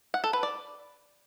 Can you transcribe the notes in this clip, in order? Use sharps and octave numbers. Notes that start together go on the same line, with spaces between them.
F#5
A4
B4
D5